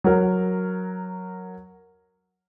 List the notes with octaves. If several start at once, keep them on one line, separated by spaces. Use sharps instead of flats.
F#3 A#4